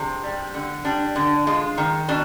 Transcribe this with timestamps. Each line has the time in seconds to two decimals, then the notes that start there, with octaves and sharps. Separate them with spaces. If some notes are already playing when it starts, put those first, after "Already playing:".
Already playing: C3 G#3 D4
0.23 G3
0.54 D3
0.85 G3 D4
1.15 D3
1.47 G#3 F4
1.78 D#3
2.08 B2 D4